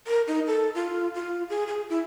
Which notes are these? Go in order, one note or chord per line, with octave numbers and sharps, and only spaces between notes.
A#4
D#4
A4
F4
F4
G#4
G#4
E4